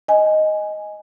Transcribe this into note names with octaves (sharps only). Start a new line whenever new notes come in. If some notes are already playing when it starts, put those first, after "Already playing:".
D#5 G#5